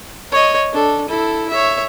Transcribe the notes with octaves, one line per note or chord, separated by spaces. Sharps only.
C#5 D#5
D4 A4
E4 A4
C#5 E5